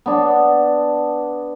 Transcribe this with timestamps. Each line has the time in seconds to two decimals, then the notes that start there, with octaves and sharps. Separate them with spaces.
0.06 B3 D4